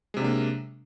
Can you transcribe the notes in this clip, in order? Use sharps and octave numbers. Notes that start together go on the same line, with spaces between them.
C3 F#3 G#3 A#3 D4